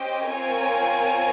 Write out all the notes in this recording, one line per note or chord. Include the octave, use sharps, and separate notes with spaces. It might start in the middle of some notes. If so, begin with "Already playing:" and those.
Already playing: C#4 G4 C5 D#5 G5
C4 F4 A#4 C#5 G#5